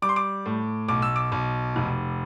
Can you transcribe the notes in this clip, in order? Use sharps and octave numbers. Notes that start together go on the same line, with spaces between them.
G3 D6
C6
D6
A2
B1 D6
E6
D6
B1
F1